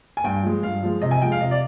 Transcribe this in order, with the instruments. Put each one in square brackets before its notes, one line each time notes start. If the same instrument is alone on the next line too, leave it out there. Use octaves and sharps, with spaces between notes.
[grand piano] G#5
G2 G5
F3 G#3
G2 F5
F3 G#3
C3 D#5
G#5
F3 G#3 G5
F5
C3 D#5
D5